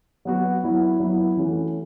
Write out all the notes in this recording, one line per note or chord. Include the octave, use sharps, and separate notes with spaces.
F#3 B3 F#4
F#3 B3 E4
F#3 B3 E4
E3 A3 C#4 F#4